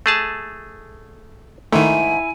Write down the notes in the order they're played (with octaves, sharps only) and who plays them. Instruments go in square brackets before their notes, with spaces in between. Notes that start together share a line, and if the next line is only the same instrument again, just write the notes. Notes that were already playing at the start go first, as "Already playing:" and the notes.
[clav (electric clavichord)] A3 G#4 A5
[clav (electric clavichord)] G#2 [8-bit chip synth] D#3 A3 [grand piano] E4 [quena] G#5